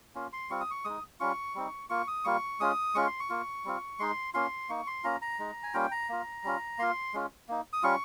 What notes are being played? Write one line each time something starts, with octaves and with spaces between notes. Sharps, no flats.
A#3 C#4 F4
C6
G3 C4 F4 C#6
D#6
C#6
G#3 D#4 D#6
G3 C#4 F4 C#6
G3 C4 D#4
A#3 F4 C#6
D#6
G3 A#3 F4 C#6
G#3 C#4 F4 D#6
G#3 C#4 F4 C#6
C6
C#6
A#3 F4
G3 C4 F4
G#3 D#4 C6
A#3 C#4 F4 C6
A#3 D#4 C#6
C6
A#3 C#4 F4 A#5
A#5
G#3 D#4
G#5
G3 A#3 C#4 F4 G5
A#5
A#3 F4
G3 C#4 F4
A#3 F4 C6
G#3 C#4 F4
A#3 D#4
D#6
G3 C#4 F4 C#6